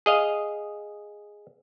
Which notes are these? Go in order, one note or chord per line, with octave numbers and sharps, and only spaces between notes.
G#4 D#5 F5